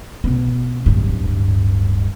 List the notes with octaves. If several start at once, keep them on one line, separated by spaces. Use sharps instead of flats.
B2 B3
D1 G2